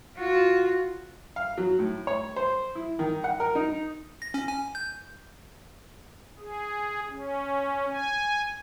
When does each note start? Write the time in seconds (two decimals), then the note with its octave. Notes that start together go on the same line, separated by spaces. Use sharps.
0.18 F4 F#4
1.36 F5
1.58 F#3
1.79 A2
2.07 C#5
2.36 C5
2.75 E4
2.99 D#3
3.24 F#5
3.40 A#4
3.55 D#4
4.22 A#6
4.34 C#4
4.48 G#5
4.75 G6
6.39 G#4
7.09 C#4
7.90 G#5